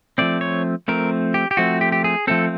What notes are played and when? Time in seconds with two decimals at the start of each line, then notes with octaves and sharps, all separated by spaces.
0.18 F3 A3 C4 D5
0.41 C#5
0.88 F3 A3 C4 A#4
1.34 G4
1.51 G4
1.57 F3 A3 C4 F#4
1.81 G4
1.92 G4
2.04 G#4
2.27 F3 A3 C4 A4